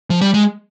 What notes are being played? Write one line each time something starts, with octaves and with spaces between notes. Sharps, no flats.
F3
G3
G#3